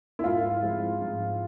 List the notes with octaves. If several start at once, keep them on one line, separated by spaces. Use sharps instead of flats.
E4
G#2 F4
F3 G#3 C4 E4
G#2